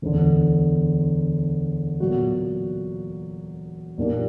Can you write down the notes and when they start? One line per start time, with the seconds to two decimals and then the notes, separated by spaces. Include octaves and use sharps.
0.02 E1 D2 D3
2.00 A#2 F#3 B3 F#4
3.98 B1 A#2 A#3 D4 G4